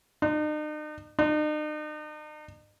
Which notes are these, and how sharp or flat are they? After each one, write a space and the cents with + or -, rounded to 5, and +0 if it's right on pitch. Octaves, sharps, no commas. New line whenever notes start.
D#4 -45
D#4 -45